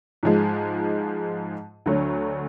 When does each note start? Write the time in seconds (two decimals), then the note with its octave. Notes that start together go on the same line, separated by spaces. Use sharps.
0.23 G#2 F3 G#3
1.86 D2 D3 F#3 A3